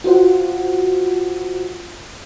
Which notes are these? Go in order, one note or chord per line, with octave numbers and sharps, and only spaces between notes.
F4 F#4 C5 F#5